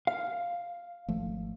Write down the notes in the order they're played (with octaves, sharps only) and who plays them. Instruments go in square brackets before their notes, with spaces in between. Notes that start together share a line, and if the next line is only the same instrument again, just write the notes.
[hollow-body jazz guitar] F5
[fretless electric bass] G#1 F3 A3